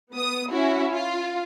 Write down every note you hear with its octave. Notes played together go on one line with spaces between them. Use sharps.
B3 D#6
C#4 E4 F#4
F4